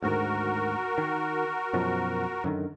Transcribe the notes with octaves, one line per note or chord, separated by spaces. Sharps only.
D2 G#2 D#3 F#4 A#4
D#3
F#2 B2 F3
F#2 D3 D#3